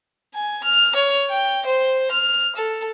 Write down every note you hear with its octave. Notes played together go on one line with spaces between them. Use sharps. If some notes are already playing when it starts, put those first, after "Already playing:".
G#5
F6
C#5
G5
C5
F6
A4